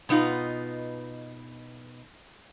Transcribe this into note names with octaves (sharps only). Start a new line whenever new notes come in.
B2 B3 D#4 F4